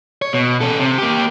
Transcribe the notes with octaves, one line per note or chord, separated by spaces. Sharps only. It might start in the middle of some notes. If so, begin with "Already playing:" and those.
C#5
B2
C#4 A4
C3
A#3 G4